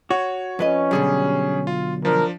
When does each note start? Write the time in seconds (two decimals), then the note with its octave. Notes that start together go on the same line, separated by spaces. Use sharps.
0.10 F#4 C#5
0.59 F2 C#4 B4 D#5
0.91 B2 D3 F#3 G3 G#4
1.67 F4
2.05 F3 D4 A#4